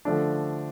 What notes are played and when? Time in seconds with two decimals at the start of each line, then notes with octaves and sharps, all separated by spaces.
0.05 D3 F3 A3 D4